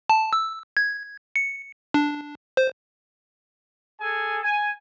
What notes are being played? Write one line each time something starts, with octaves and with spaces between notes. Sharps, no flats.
A5
E6
G#6
C#7
D4
C5
G#4 A4 G#5
G#5